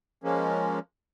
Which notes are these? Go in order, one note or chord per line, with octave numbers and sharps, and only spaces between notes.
F3 G#3 A#3 C#4